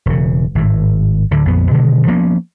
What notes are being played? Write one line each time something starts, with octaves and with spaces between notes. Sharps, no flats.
E1 C#3
G#1 A2
D2 A2 D3
A#1 F2 B3
B2 D3 D#3 G#3
F3 A#3 B3 C#4